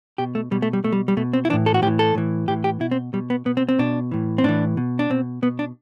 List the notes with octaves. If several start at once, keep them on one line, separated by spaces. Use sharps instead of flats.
B2 G4
A3
B2 G3
A3
G3
B2 A3
G3
G3
B2 A3
C4
E4
A2 E3 D4
A4
F#4
A2 E3 G4
A4
A2 E3
A2 E3 G4
G4
B2 E4
C4
B2 G3
B3
B2 B3
C4
C4
B2 D4
A2 E3
C4
A2 E3 D4
B2
D4
B2 C4
B2 B3
D4